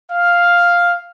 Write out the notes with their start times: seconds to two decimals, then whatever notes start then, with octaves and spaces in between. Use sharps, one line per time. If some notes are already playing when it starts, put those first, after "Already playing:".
0.12 F5